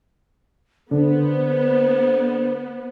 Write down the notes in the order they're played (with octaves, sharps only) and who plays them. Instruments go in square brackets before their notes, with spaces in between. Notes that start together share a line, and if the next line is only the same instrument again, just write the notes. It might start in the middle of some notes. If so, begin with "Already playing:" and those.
[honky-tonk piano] D3 [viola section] B3 [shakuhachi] C5